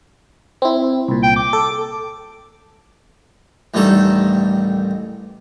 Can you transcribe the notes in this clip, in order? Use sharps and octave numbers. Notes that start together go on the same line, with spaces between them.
C4 E4
C2 A#2
G5
D6
A4
A1 D2 D#3 G3 A4 A#5